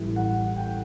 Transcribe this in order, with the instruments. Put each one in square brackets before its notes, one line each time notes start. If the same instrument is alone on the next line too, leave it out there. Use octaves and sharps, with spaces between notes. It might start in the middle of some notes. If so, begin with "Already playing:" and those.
Already playing: [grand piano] A1 A2 E3 G3
F#5
G5